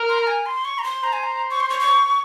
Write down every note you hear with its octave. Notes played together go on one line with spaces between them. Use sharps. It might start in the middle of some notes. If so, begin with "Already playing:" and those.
Already playing: A#4
C6
A#5
G#5
C6
C#6
A#5
C6
C5 A#5
G#5
A#5
C#6
C6
C#6
C#6